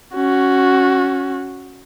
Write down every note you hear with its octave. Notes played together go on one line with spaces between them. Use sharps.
C#4 F#4